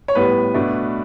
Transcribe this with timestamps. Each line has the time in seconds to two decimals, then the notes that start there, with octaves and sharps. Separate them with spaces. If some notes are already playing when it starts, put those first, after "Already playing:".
0.08 C#5
0.15 A2 G3 B3 B4
0.54 B2 A3 D4